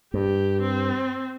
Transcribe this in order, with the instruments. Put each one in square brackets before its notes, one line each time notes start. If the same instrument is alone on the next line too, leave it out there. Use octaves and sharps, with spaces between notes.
[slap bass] G2 [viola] G4
[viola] C4